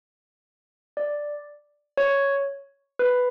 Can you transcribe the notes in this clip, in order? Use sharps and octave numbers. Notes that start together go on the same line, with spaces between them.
D5
C#5
B4